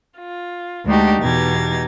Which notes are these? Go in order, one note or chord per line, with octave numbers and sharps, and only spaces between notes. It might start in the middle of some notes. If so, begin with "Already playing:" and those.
F4
D2 G#3 D4 D#4 F#4 G4
E2 B2 D#4 G4 G#6 A6